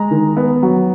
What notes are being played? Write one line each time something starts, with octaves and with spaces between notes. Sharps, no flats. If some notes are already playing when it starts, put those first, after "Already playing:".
Already playing: G#3 A#5
D#3
B3
F#3